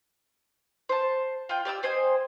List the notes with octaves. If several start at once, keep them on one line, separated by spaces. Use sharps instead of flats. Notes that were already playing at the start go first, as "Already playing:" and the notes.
C5 A5
F4 G5
G4 D5 D#6 E6
C4 C5 D#5 G#5